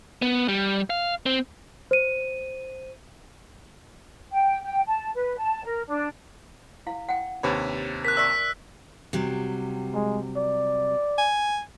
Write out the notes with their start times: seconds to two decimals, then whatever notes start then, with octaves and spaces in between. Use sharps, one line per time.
0.22 B3
0.49 G3
0.90 F5
1.26 C4
1.91 C5 D#7
4.31 G5
4.63 G5
4.86 A5
5.15 B4
5.37 A5
5.63 A#4
5.87 D4
6.87 E4 F5
7.09 F#5 G5
7.43 D#2 C3 D4 B4 C#5 B5
8.05 A#4 F#6 B6
8.17 G4 D5 E5 E6 B6
9.13 C3 F#3 G3
9.94 G#3
10.37 D5
11.18 G#5